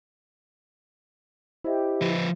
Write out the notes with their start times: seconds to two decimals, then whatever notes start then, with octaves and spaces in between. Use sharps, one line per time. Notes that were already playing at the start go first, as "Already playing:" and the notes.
1.64 E4 G4 C5 D#5 E5
2.02 F3 B4